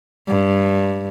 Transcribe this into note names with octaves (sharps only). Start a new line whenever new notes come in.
G2